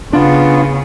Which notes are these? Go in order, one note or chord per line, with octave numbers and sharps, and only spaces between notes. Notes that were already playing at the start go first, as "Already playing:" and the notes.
C#3 B3 D4 F4